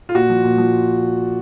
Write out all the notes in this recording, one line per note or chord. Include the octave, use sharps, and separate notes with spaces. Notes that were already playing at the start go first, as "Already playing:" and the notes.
F4
A#2 F#4
F3
A#2
F3